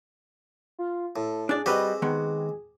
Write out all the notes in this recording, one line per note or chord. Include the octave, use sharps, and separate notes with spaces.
F4
A2 A4
D4 G#4 D5
G3 C4 F#4 G4 B4 D#5
D#3 G#3 B3